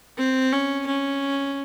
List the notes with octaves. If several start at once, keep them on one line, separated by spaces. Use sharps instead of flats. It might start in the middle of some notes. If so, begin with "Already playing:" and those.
C4
C#4
C#4